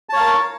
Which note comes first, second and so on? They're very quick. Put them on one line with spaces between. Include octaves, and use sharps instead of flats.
A5 C#5 F5 A#4